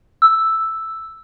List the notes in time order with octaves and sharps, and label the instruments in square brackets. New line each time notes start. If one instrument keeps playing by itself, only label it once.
[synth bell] E6